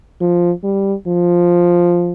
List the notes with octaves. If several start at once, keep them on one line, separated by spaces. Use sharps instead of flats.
F3
G3
F3